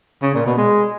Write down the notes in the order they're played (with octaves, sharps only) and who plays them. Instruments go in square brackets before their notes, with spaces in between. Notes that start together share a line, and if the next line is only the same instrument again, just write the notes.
[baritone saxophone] C#3
A#2
B2
G#3